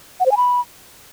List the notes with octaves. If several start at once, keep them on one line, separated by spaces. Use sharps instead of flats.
F#5
C5
G#5
B5